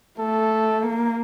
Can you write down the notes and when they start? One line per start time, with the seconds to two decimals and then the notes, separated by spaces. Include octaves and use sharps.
0.19 A3 A4
0.83 A#3